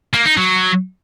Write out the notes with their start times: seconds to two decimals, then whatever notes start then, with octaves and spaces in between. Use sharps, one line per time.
0.14 A#3
0.25 D#4
0.37 F#3